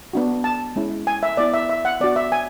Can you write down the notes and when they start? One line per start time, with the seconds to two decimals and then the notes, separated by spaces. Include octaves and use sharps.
0.13 B3 D4 F#4
0.44 A5
0.76 G#3 C#4 E4
1.07 G#5
1.23 E5
1.37 B3 E4 D5
1.54 E5
1.69 E5
1.85 F#5
2.01 B3 D4 F#4 D5
2.16 E5
2.32 G#5